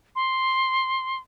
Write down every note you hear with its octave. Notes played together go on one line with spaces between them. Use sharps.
C6